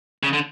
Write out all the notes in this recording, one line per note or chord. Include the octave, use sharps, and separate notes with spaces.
C#3
D3